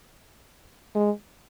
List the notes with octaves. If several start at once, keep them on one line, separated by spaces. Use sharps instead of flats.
G#3